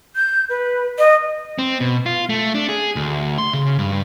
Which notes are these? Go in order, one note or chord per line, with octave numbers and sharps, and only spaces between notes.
G6
B4
D#5
C4
B2
F4
A3
D4
G#4
D2
C6
C#3
G2